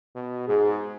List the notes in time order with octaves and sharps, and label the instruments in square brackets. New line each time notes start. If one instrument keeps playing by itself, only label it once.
[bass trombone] B2
[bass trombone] G#2 [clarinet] G#4